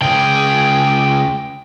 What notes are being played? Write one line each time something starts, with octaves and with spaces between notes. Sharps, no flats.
C#2 G#4 G5